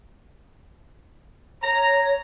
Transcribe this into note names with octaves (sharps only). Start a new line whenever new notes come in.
C#5 A#5